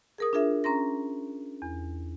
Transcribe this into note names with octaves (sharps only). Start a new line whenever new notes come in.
G#4 A#4 D#6
D4 F4 G#4 A#4 E5
C#4 A#5 C6 A#6
E2